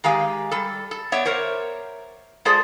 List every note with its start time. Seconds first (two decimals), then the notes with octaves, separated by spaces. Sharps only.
0.04 D#3 G#3 G4 F5 G#5
0.51 G3 A4
0.91 A4
1.12 B3 C#5 D5 E5
1.25 A#4 C5 C#5 E5
2.45 G#3 F4 G#4 A4 C5 D5